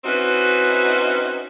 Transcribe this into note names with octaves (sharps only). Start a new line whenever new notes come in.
C4 C#4 D#4 E4 F#4 B4